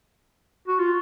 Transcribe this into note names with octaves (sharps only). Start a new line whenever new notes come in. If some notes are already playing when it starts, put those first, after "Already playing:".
F#4
F4